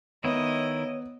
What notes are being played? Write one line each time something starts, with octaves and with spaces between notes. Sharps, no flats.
D#3 B3 E4 C#5 D#5